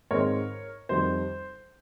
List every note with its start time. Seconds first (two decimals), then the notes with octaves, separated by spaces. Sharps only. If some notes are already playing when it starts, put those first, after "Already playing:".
0.11 G#2 D#3 G#3 C4 A#4 C#5
0.89 F2 D#3 G3 C5